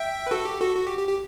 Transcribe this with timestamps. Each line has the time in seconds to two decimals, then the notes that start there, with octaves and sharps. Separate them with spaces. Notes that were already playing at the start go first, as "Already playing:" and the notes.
Already playing: E5 G5
0.26 B4
0.31 F#4 A4
0.45 G4
0.61 F#4 A4
0.75 F#4
0.87 G4
0.98 G4
1.08 G4